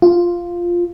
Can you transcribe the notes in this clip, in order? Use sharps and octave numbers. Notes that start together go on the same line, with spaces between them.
F4